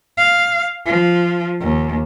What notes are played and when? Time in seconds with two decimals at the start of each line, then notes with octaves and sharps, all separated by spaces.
0.17 F5
0.86 F3
1.60 D#2